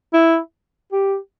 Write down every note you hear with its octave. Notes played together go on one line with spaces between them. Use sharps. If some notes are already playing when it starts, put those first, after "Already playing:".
E4
G4